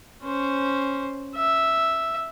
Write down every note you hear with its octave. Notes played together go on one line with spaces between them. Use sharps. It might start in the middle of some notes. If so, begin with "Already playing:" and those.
C#4 C5
E5